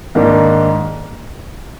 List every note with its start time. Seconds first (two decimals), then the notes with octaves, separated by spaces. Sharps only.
0.15 G#2 D#3 A#3 D4